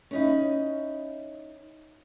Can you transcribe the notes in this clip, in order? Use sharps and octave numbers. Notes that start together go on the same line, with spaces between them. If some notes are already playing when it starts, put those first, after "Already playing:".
C#4 D#4 E4